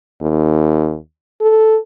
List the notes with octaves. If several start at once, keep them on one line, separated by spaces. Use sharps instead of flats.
D#2
A4